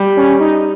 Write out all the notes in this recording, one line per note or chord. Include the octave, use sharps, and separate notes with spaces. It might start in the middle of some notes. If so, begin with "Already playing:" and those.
Already playing: G3
C#4
D#4